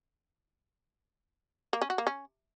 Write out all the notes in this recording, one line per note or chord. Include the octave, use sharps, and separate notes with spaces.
A#3
C#4
F#4
A#3
C#4